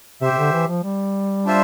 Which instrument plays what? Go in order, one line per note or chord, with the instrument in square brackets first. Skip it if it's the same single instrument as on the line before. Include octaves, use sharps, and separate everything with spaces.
[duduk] C3 [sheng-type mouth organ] G4 C5 E5
[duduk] C3
D3
E3
F3
G3
[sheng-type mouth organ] D4 F4 C5 E5